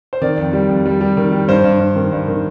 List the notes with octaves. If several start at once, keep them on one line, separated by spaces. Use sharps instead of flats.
C5
D#3 D5
F2
G3
F2
G3
G3
D#3
G3
G2 C5
G2
G2
D#3
G2
D#3